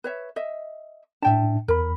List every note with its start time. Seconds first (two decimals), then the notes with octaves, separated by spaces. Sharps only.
0.04 B4 C#5 E5
0.36 D#5 E5
1.22 A2 D4 E5 G5 A5
1.68 E2 A#4 B5